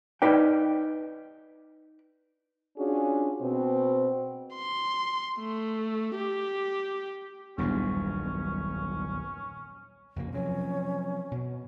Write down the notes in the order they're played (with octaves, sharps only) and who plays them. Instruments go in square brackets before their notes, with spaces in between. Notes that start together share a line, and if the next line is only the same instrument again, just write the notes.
[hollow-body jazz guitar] D#4 B4 D5 G5
[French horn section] C#4 D4 F4 F#4 G#4
B2 C4
[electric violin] C6
A3
G4
[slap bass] D#1 B1 A#2 [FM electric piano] E2 G2 [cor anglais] C#4
[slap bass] F2 C#3 A#3
[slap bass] C3 F3 F#3 [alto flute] C#4
[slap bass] B2